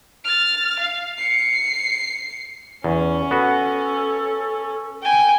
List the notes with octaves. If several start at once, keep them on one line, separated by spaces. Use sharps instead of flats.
F6 A6
F5
C7 C#7
E2 C#4
B3 F#4 A4
G5 G#5